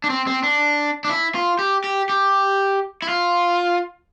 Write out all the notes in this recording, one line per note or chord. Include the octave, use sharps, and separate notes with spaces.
D4
C4
C4
D4
D4
E4
F4
G4
G4
G4
E4
F4